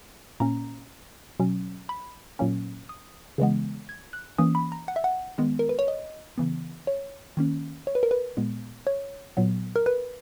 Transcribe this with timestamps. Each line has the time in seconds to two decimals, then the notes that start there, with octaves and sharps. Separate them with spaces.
0.40 A#2 A#3 C#4 A#5
1.40 B2 F#3 C#4
1.89 B5
2.39 A#2 F#3 A#3 C#4
2.89 D#6
3.38 C#3 E3 G#3 B3
3.89 G#6
4.13 F#6
4.38 E3 A#3 C#4 D#6
4.55 B5
4.72 A#5
4.88 F#5
4.96 E5
5.04 F#5
5.38 D#3 G#3 B3
5.59 A#4
5.69 B4
5.79 C#5
5.88 D#5
6.38 C#3 E3 B3
6.87 C#5
7.37 D#3 A#3 C#4
7.87 C#5
7.95 B4
8.03 A#4
8.11 B4
8.37 A#2 G#3 B3
8.87 C#5
9.37 A#2 F#3 B3
9.76 A#4
9.86 B4